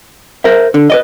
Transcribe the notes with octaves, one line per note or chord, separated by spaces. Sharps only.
A#4 C5 E5
D3
B4 D5 D#5